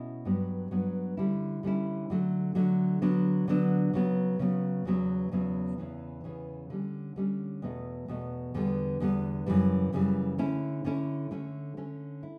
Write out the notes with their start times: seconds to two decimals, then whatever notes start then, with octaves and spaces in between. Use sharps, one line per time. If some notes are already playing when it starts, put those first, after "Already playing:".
Already playing: B2 A3 C#4 E4
0.25 G2 F#3 B3
0.71 G2 F#3 B3
1.17 D3 G3 C#4 E4
1.63 D3 G3 C#4 E4
2.10 D3 F#3 A3
2.55 D3 F#3 A3
3.02 D3 F#3 B3 D4
3.48 D3 F#3 B3 D4
3.93 C#3 F#3 B3
4.39 C#3 F#3 B3
4.85 E2 C#3 F#3 B3
5.32 E2 C#3 F#3 B3
5.78 E2 C#3 E3
6.24 E2 C#3 E3
6.70 D3 G3 C#4
7.16 D3 G3 C#4
7.62 E2 B2 A3
8.08 E2 B2 A3
8.54 E2 D3 G3 B3
9.00 E2 D3 G3 B3
9.46 F#2 C#3 E3 G3
9.93 F#2 C#3 E3 G3
10.38 D3 A3 C#4 E4
10.85 D3 A3 C#4 E4
11.31 D3 A3 C#4
11.77 D3 A3 C#4
12.23 E4